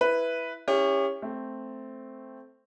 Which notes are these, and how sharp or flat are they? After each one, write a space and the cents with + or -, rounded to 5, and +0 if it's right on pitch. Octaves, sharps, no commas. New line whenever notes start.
E4 +0 B4 +0
C#4 +0 E4 +0 G4 +40
A3 +0 C4 +0